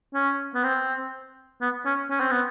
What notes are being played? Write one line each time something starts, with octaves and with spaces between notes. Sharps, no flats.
C#4
B3
C4
B3
C#4
C#4
C4
B3